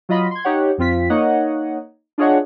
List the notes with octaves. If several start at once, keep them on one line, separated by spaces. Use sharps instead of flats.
F#3 F4 D#5 B5
C6 G#6
D#4 G4 C#5 F#5
F2 C4 F4 B6
A#3 D#4 C#5 D#5 F#5
D4 F4 G#4 C#5 D#5 F#5